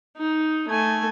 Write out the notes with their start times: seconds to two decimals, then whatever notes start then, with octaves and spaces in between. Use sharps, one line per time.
0.17 D#4
0.69 A3 G#5